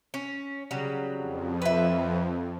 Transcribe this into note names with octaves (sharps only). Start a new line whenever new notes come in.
C#4
C#3 F#3 G3
F2
B4 E5